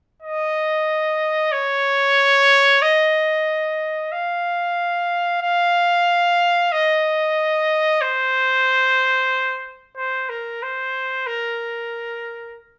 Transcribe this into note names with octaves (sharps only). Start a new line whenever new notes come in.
D#5
C#5
D#5
F5
F5
D#5
C5
C5
A#4
C5
A#4